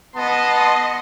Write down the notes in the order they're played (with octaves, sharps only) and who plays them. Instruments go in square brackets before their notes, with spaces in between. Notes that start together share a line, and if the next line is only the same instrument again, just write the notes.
[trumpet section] B3 A5 [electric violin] D#5 C6